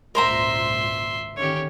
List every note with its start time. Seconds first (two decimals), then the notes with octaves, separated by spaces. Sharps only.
0.15 G#1 C#2 A#2 A#4 C5 E5 A#5 C6
1.36 D3 D#3 C#4 G4 C#5